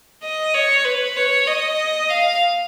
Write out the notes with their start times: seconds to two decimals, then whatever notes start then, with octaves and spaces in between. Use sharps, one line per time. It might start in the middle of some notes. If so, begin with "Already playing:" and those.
0.23 D#5
0.54 C#5
0.85 B4
1.17 C#5
1.47 D#5
2.10 F5